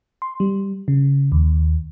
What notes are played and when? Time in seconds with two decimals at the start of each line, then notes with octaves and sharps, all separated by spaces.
0.22 C6
0.40 G3
0.88 C#3
1.32 D#2